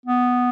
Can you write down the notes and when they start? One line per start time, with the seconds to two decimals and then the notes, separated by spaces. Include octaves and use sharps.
0.06 B3